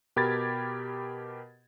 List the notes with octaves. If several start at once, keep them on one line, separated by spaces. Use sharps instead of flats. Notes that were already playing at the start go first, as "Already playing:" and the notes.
B2 G4 A#4 B5 G#6 A6